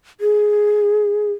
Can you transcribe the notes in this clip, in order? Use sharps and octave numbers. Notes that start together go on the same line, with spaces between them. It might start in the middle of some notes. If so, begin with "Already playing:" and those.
G#4